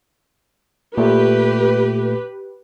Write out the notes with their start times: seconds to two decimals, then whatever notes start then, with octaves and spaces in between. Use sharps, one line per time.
0.98 A#2 A3 G4 B4